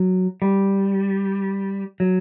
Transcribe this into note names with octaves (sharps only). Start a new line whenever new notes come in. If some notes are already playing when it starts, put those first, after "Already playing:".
Already playing: F#3
G3
F#3